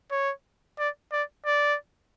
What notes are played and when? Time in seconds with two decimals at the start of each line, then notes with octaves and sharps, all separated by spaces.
0.11 C#5
0.79 D5
1.12 D5
1.46 D5